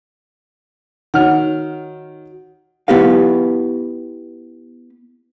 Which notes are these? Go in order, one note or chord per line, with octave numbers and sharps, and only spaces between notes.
D#3 F#4 C#5 F#5 F6
B3 E4 G4 B4 F5